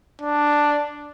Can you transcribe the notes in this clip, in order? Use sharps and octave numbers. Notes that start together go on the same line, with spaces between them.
D4